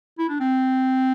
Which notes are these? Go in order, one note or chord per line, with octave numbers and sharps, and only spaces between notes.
E4
D4
C4